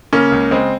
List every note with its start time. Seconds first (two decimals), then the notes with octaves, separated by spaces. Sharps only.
0.13 C#3 A#3 C#4
0.32 C#2
0.51 C#3 G#3 C4